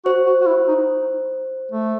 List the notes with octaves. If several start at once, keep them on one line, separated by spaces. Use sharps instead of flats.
F#4 C5
F#4
F#4
E4
D#4
A3